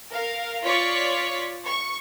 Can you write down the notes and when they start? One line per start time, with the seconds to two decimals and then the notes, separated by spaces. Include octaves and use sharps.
0.11 A#4 F5
0.64 F4 C#5 D5 C#6 B6
1.65 C#6